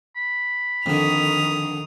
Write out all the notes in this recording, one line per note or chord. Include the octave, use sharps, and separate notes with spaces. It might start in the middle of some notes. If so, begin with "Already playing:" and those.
B5
F2 D3 D#3 D#6 F7